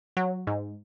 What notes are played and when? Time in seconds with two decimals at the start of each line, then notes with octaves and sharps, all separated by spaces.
0.17 F#3
0.47 G#2